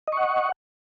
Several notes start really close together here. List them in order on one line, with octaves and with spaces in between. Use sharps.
D#5 C#6 F#5